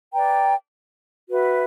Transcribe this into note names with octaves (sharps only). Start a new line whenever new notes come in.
B4 D5 G5 A#5
F#4 B4 E5